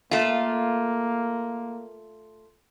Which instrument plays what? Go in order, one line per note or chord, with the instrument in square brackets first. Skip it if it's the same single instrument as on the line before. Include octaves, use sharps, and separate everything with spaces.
[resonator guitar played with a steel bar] A3 F4 [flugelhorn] A#3